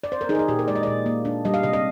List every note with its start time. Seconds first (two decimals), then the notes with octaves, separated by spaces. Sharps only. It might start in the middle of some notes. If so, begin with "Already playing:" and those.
0.04 D5
0.12 C5
0.21 A#4
0.29 D#4 G#4
0.35 A#4
0.39 G#4
0.48 A#2 G4
0.59 A#4
0.68 G#3 D5
0.75 D#5
0.83 A#2 D5
1.06 A#3
1.25 D4
1.45 G3 D#5
1.54 F5
1.63 C3 D#5
1.73 D#5